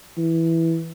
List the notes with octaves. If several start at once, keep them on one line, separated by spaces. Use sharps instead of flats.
E3